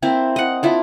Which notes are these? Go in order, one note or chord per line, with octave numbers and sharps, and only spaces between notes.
A#3 C4 E4
D#5 F#5
D4 E4 F4